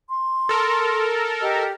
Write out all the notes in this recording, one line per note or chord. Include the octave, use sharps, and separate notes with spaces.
C6
A4 A#4
G4 D#5